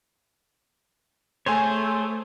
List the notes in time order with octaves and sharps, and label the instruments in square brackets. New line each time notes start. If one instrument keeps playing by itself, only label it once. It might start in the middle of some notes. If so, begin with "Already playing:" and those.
[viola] A3 [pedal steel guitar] G#4 C5 C#5 [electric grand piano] G#5 C6